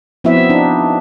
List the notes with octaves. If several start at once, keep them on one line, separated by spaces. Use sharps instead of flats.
F3 B3 C4 E4 F#4 E5
D4 D#4